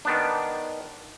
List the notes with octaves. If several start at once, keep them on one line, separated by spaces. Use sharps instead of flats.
D#3 B3 D4